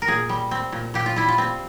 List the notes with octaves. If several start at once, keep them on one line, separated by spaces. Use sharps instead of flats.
A#4
A#2 G#4
G3
C4
A#2
A#2 G4
F4
G3 E4
F4
C4